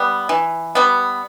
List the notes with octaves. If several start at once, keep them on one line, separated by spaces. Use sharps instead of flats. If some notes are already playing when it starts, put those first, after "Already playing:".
Already playing: G3 B3
E3
G3 B3